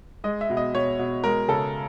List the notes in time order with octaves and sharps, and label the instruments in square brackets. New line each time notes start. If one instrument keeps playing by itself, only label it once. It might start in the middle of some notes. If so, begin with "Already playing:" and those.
[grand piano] G#3 D#5
E5
B2
D#5
B2 C#5
B2
G#3 A#4
C#3 A4